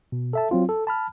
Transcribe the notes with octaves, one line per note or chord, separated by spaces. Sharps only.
B2
A4 E5 A5
F#3 C4 F4
A4
A5 B5 F6